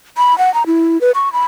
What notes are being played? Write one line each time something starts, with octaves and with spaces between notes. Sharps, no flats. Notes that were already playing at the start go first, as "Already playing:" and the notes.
B5
F#5
A#5
E4
B4
C#6
B5